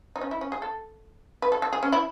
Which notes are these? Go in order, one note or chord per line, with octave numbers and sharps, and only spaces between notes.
D#4
C#4
E4
C#4
G#4
A4
B4
A4
A4
G#4
C#4
E4